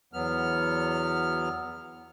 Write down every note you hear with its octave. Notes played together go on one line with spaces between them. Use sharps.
E2 F#3 B3 F6